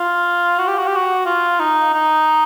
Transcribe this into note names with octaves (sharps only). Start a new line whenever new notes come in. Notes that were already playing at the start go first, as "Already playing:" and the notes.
Already playing: F4
F#4
G4
F#4
G4
F#4
F4
D#4
D#4